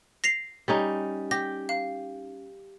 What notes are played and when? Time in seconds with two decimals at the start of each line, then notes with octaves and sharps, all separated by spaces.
0.24 A#6 C7 F7
0.68 G3 C#4 D#4
1.31 G4 A#6
1.69 F5